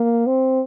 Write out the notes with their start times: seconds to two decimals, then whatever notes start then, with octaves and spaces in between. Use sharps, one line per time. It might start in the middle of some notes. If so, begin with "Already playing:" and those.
Already playing: A#3
0.27 C4